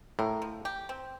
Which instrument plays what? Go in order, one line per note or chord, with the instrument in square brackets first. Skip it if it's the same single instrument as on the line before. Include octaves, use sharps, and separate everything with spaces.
[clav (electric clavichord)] A2 [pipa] A#4
[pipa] F3
G4
C4